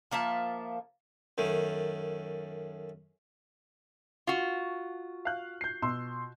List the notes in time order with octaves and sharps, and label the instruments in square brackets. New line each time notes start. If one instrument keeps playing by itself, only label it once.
[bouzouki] F3 A#3 E5 A5
[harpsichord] F#2 D#3 A3
[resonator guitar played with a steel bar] F4 F#4
[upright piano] F5 F#6
G6 C7
B2 C6 E6